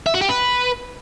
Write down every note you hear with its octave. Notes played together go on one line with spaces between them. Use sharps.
E5
F#4
G4
B4